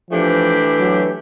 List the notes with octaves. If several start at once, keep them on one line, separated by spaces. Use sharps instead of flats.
E3 F3 A3 D4 G4
F#3